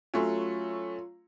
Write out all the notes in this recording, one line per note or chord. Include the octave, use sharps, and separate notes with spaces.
F#3 A3 C#4 F4 C6